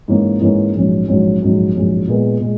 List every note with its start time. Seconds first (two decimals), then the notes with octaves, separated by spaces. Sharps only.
0.08 G#2 E3 A#3 C#4
0.41 G#2 E3 A#3 C#4
0.75 A#1 G#2 F#3 C#4
1.08 A#1 G#2 F#3 C#4
1.41 A#1 G#2 F#3 C#4
1.75 A#1 G#2 F#3 C#4
2.07 A#2 G#3 B3
2.40 A#2 G#3